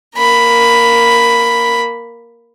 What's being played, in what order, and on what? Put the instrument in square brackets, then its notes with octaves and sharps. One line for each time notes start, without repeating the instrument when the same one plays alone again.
[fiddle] A#3 B5